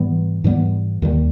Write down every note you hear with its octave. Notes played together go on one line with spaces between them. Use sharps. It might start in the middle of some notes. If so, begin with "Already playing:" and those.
Already playing: G#2 E3 G3 B3
G#2 E3 G3 B3
D#2 D#3 G3